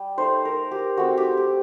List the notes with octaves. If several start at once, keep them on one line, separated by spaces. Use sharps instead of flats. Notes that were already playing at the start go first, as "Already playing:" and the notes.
Already playing: G3
A3 D#4 C5
A#4
G4
A3 C4 D#4 F#4
G4
G4